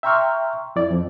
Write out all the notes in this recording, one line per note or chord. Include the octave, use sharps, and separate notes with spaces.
E5 G5 A#5 C6 C#6 F6
F2 E4 D5
F2